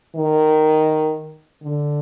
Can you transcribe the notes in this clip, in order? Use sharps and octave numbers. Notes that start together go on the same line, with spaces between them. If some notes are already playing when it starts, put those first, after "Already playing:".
D#3
D3